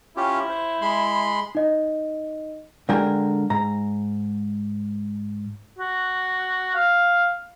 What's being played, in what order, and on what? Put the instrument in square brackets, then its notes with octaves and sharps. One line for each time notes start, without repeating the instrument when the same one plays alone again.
[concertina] C#4 F4 G4 [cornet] E4
[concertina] C5
G#3 B5 C6
[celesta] D#4 D#5
[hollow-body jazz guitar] D3 G#3 G4 A#4 G5 G#5
G#2 A#5
[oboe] F#4
F5